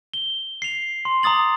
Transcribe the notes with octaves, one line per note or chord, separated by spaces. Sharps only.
G7
C7 F7
C6
A#5 D6 D#6 A6 F#7